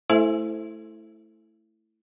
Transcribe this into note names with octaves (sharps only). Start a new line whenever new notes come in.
A3 E4 A4 C5 E5 G#5